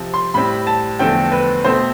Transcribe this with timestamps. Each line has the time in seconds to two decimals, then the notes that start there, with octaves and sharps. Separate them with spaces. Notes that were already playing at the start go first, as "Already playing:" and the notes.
Already playing: C3 F3 C4
0.14 C6
0.34 A2 G3 C4 B5
0.67 A5
0.99 E2 D3 F3 A3 C4 G5
1.32 B4
1.64 B2 A3 C4 C5